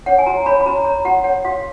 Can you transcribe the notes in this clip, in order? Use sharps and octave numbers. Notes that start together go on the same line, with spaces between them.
C#5 F#5
G#5
F#4 A#5
C#5 B5
B5
F#4 A#5
C#5 A#5
F#4 F#5
C#5 F#5
F#4 F5